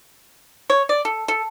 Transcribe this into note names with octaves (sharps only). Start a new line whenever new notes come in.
C#5
D5
A4
A4